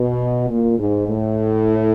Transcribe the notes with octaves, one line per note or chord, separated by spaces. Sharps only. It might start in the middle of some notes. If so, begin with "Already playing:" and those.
Already playing: B2
A#2
G#2
A2